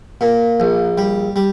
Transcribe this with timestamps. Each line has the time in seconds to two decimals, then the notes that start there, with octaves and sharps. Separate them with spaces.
0.21 A#2
0.60 A#1
0.98 G3
1.36 G3